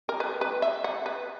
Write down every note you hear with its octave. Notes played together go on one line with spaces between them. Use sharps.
A#4
B4
B4
E5
F#5
B4